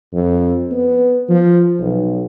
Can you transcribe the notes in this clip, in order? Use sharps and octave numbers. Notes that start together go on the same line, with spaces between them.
F2
B3
F3
B1